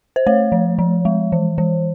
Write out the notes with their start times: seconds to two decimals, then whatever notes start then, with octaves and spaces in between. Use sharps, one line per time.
0.16 C5
0.27 A3 C#5
0.52 F3
0.79 F3
1.05 G#3
1.32 E3
1.58 E3